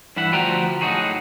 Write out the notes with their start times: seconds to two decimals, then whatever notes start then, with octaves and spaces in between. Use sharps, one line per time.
0.16 G2 E3 E4 E5 F#5
0.32 D2 F3 G3 F#4 G5 A#5
0.81 A2 F#3 D#4 F#4 G#4